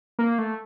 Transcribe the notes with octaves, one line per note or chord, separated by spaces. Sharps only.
A#3
A3